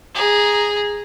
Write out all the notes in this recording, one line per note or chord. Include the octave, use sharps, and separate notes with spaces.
G#4 A#5